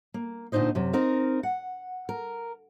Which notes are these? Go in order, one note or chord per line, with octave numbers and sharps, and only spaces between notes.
A#3
D2 A#2 D4 D#4 C5 D#5
F#2 C3
C4 D#4 A#4 F5
F#5
A#4